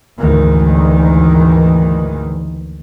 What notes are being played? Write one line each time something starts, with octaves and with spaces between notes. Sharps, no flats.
F#1 D2 G#2 D#3 E3